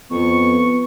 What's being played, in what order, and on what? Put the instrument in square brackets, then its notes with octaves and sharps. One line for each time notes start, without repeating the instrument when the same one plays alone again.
[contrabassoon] F2 [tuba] B3 [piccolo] C#6